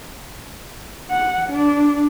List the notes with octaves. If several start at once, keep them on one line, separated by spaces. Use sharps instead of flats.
F#5
D4